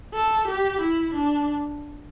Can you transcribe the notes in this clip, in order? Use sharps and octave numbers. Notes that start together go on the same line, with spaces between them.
A4
G4
E4
D4